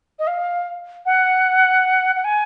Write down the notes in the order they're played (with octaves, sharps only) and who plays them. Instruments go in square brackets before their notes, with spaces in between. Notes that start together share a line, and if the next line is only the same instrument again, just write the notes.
[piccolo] D#5
F5
F#5
F#5
G#5